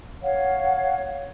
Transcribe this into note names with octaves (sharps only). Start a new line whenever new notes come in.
C#5 F5 F#5